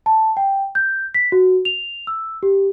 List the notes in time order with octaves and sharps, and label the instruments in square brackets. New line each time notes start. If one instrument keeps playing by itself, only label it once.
[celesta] A5
G5
G6
B6
F#4
F7
E6
G4